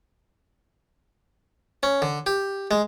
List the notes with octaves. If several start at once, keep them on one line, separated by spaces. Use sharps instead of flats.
C#4
D3
G4
G#3